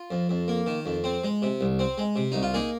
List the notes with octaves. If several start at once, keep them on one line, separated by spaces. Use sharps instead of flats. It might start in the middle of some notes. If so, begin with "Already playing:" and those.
Already playing: F4
F2
F2
A#3
D#3
F2
C4
G#3
C3
C2
C4
G#3
C3
C2 D#4
F4
A#3 D#4 G#4